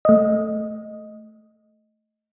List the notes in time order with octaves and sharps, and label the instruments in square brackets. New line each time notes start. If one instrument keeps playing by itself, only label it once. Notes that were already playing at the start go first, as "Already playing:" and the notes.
[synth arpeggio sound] A3 D#5